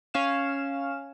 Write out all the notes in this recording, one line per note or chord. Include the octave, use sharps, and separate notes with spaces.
C#4 F5 F6 E7